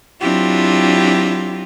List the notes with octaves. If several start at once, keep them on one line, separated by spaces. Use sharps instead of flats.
F#3 C4 D4 E4 F4 G4